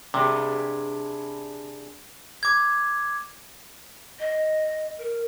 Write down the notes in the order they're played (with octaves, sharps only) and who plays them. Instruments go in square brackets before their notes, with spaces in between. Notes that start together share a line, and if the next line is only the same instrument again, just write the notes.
[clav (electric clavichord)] C3 [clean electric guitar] D4 G#4 B4
[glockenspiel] D6 G#6
[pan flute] D#5
A#4